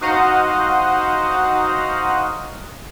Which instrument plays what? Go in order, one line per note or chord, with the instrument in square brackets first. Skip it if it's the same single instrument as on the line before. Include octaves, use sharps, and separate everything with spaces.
[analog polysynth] D#4 F#4 C5 D#5 F5 F#5